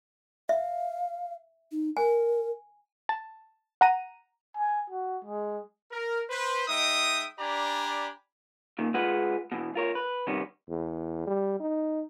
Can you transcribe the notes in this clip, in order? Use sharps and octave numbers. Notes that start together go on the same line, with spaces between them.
E5 F5
D#4
A#4 G#5
A5
F#5 A#5 D#7
G#5
F#4
G#3
A#4
B4 C5
G#3 D#4 E5 G5 D#6
D4 G4 D5 G#5 A#5 B5
A#2 D#3
G#3 F4 G#4 B4 F#5
B2 E3
F4 A#4 C#5
B4
C3 D#3 G3 B3 C#4
E2
G3
D#4